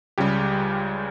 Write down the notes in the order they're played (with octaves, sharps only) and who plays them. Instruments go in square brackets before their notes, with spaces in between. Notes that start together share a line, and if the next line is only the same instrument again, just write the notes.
[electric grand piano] C#2 C#3 G3 G4